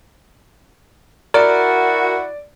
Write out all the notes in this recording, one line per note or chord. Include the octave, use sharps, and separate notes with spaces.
E4 F#4 A#4 D5